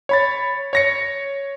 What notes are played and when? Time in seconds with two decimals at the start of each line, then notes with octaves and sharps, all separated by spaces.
0.09 C#5 B5 A6
0.73 C#5 A#6 C#7